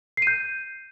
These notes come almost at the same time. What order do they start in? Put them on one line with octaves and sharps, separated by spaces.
C7 D#7 G6